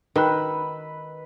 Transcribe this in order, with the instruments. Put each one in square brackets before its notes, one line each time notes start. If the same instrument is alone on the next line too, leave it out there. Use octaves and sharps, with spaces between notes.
[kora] D#3 [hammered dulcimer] B4 [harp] B5 E6 F#6